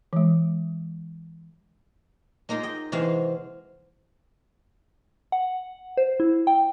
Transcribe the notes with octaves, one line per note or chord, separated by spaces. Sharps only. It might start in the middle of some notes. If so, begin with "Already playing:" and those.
E3 G#3
G#3 A#3 D#4 F4
D#5 G5
C3 E3 G#3 C4 F#4 F5
F#5
C5
E4
G5